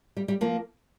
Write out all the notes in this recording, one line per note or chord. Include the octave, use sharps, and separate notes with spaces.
G3
G3
F3 A#3